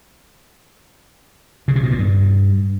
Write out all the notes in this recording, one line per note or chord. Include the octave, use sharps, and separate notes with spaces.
C#3
C3
B2
A#2
G2